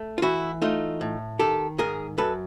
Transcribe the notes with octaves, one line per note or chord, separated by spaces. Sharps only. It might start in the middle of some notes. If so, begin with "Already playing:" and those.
Already playing: A3
F4
E3 E4 F#4
A3 D#4 F4
A2
D#3 G4 A4
G#2 G#4 A#4
F#2 A4 B4